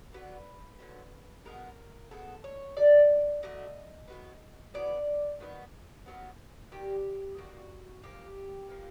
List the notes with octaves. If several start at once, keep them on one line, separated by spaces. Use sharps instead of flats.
D3 F#3 B3 B4
D3 F#3 B3
B2 G#3 B3 A#4
B2 G#3 B3 A4
C#5
D3 F#3 A3 D5
D3 F#3 A3 D#5
A2 F#3 B3
A2 F#3 B3 D5
D#3 F#3 B3
D#3 F#3 B3
D#3 G3 A#3 G4
D#3 G3 A#3 F#4
A#2 F3 A#3 G4
A#2 F3 A#3